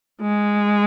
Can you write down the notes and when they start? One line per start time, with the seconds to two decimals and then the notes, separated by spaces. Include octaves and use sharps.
0.21 G#3